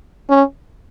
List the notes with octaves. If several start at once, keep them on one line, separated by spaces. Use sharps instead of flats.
C#4